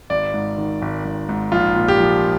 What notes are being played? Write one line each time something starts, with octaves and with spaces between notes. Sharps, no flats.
G#1 D5
G#2
D#3
G#1
G#1
G#2
A#1 F4
A#2
G4
F3